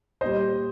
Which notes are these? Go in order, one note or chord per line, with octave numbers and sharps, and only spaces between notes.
A#2 G3 C5 D#5